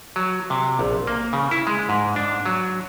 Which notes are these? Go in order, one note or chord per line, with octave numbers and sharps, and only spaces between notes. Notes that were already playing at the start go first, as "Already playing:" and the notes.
F#3
C3
A#1
A#3
C#3
E4
G#3
G#2
D4
F#3